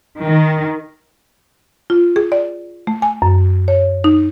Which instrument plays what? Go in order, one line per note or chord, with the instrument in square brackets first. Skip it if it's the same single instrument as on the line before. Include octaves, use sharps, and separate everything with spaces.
[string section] D#3
[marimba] F4
G#4
D5
A3
G#5
F#2
C#5
D#4